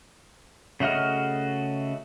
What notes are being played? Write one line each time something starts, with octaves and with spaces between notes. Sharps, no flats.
C#3 A3 F#4 D#5 F6